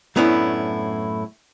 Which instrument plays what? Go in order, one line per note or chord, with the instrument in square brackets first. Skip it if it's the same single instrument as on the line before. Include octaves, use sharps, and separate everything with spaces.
[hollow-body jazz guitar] F#2 A2 B3 C#4 D4 E4